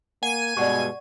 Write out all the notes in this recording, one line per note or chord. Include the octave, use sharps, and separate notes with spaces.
A#3 F#5 G#5 D#7
G2 B2 G#3 D5 F#5 C#6